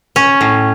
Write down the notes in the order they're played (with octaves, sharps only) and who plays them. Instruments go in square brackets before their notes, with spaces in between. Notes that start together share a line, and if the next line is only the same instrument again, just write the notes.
[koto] C#4
A2